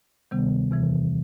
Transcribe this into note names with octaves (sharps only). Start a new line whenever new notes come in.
D2 C3 D#3 G3 B3
E2 C3 E3